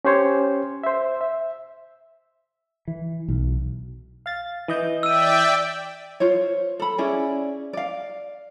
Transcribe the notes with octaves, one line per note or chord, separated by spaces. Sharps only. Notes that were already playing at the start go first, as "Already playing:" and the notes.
C#4 G4 C5 C#5
C5 E5
E5
E3
B1
F5 A6
E3 D#5 G6
D5 E5 G5 E6 D#7
F4 C5 C#5
A4 B5
C#4 E4 G#4 D5
D5 F5